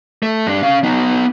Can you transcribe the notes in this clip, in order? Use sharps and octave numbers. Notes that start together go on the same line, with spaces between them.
A3
G2 D4
C#4 F5
B3 D#4